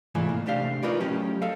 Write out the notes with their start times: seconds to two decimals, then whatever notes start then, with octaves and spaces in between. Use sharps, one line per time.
0.15 C2 G#2 E3 A3 F4 G#5
0.29 A#3
0.46 C3 A3 D4 G4 F5
0.83 D#4 F4 A#4 B4 C#5 D5
1.00 F#3 A3 C#4 G4
1.42 A4 D#5 F5